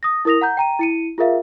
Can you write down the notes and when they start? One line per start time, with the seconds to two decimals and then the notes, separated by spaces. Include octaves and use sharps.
0.03 D#6 A#6
0.25 E4 A#4 D#6 A#6 F7
0.41 F#5 A#5 G6
0.57 G5 A#5 D#7
0.79 E4 C#7 D#7
1.18 F4 G#4 A#4 E5 F5